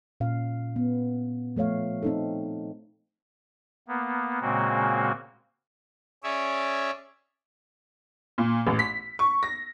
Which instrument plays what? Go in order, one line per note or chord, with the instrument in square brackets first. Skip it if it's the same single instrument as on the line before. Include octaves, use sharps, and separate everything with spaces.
[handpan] A#2 C#4 F5
B3
F3 A3 C#5 F5
C4 D#4 A4
[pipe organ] A#3 B3
A#2 C#3 G#3 A#3 C4 F#4
C#4 G#4 C#5 D5 E5
[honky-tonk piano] A#2
A1
B6
C#6
A#6